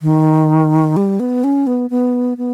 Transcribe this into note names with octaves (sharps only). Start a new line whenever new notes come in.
D#3
G3
B3
C#4
B3
B3
B3